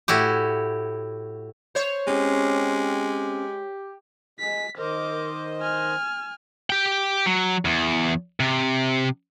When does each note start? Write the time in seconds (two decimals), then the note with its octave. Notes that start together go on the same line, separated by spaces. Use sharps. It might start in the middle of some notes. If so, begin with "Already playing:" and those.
0.08 A2 E4 F#4 G4
1.75 C5 C#5
2.07 G#3 C4 C#4 G4
4.40 G#3 G#4 B6
4.78 D#3 A#4 C5 D#5 D6
5.60 G#5 F6
6.70 G4 G5
7.26 F#3
7.65 E2
8.40 C3